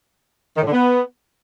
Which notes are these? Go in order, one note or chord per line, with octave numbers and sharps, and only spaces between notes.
D#3
A2
D3
B3